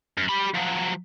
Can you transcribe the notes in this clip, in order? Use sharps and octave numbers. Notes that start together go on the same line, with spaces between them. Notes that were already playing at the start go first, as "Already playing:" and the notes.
F#2
G4 B5
F3 F#3